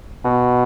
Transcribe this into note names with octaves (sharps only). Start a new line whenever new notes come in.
B2